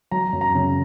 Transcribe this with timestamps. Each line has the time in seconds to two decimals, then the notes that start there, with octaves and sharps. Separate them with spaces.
0.11 F#3 A#5
0.33 F#2
0.41 A#5
0.55 C#3